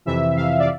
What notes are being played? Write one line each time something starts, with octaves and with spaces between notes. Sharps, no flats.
F2 C3 E3 E5
F2 C3 E3 F5
D5